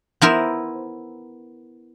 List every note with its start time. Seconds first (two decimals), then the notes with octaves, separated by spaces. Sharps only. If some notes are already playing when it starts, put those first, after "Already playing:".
0.21 B3 E4 A#4 C5